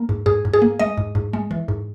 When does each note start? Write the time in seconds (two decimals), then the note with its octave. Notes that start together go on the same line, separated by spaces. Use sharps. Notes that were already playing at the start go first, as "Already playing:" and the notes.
Already playing: A#3
0.09 G#2
0.26 G#2 G#4
0.45 G#2
0.53 G#4
0.62 A#3
0.79 G#3 D#5
0.98 G#2
1.15 G#2
1.33 G#3
1.51 E3
1.68 G#2